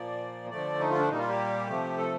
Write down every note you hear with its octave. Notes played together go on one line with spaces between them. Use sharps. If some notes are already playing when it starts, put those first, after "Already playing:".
Already playing: A#2 F3 A#3 D5
D3 F3 A3 D5
D#4
F4
D4
A#2 G3 A#3 D#4
F4
G4
C3 F3 A3
A4